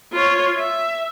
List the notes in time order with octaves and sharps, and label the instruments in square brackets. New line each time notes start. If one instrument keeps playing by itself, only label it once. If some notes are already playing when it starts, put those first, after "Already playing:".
[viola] F4 C#5
E5